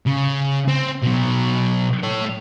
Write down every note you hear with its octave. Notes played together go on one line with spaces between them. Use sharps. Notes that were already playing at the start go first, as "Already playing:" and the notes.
C#3
C4
B2 F#3
A3 C#5